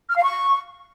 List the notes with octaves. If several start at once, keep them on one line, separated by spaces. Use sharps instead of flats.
F6
F5
C#6